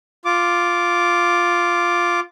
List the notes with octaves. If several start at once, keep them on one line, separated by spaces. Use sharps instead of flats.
F4 D6